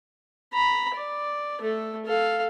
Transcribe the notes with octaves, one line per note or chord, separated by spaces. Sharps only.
A#5 B5
D5
A3 A4
A4 F5